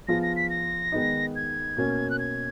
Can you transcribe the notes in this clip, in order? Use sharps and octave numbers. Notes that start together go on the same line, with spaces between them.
F3 B3 F4 G#4 A#6
A#6
B6
A#6
D#3 G#3 B3 D#4
G#6
B2 A#3 C#4
F#6
G#6